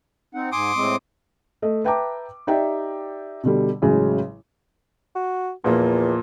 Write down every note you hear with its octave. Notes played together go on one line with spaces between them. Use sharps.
C4 D#4 F#5
G#2 G#5 C6 D6 D#6
A2 G#3 C4
A3 D#5
B4 E5 G5 A5 A#5 D6
D#4 G4 D5 E5 G5
B2 D3 G3
A1 C#3 F#3 G#3
F#4
E2 A#2 F3 A#3